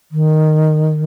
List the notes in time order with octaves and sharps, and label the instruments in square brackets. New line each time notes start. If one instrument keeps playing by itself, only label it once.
[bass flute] D#3